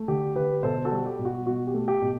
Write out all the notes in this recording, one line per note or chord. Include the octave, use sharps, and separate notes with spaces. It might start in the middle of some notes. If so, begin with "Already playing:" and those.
Already playing: A3
D3 G4
D3 G4 B4
B2 A4 C5
F#4 A4
G3
G4
B2
F#4
B2 F#4
G4
A3
G4
B2